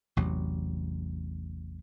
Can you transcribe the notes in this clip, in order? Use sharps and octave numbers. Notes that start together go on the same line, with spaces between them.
A1 E2 C3 F#3